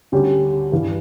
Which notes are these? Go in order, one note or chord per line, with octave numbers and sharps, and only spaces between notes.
D2 D3 G3 C#4 G4
G2 E3 G3